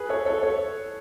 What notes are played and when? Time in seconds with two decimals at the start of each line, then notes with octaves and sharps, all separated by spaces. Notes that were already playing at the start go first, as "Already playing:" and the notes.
Already playing: G#4 B4
0.09 A4 C#5
0.26 A4 C#5
0.43 A4 C#5